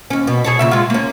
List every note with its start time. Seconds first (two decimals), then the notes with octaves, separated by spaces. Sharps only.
0.10 D#2 C#4
0.27 B2
0.44 G#4 A4 C#5
0.59 A#2 C#3 E5
0.71 G#3 F4
0.90 A#3 C#4